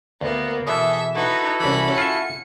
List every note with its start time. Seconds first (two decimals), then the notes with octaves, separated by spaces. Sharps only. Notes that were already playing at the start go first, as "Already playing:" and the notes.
0.21 D2 A#3 B3
0.67 B2 E3 G#4 A4 E5
1.15 D#4 E4 F#4 A4 B4
1.60 C2 E3 C#4 B5
1.98 F4 E5 C#7